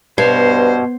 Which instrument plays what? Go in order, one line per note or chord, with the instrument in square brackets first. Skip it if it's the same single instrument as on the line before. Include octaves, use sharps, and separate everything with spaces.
[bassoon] G2 [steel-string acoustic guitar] B2 [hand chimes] B4 G#6 C7 [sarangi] C5